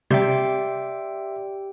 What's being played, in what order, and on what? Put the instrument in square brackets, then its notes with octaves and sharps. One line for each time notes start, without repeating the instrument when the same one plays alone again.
[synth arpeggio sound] C3 G3 G6 [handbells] G4 G5 [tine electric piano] D5 E5 C6